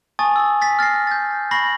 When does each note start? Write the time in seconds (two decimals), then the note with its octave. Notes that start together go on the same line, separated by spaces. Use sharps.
0.19 G#5 A5 C#6 D#6 A6
0.36 E6
0.62 A6 B6
0.79 F6 A6 A#6 C7
1.07 G6 A6
1.51 B5 C#6 A#6 C7 F#7